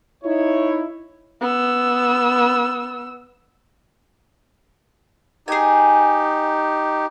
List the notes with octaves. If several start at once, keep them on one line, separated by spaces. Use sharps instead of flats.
D#4 E4 C#5
B3 E6
D#4 G4 G#4 G#5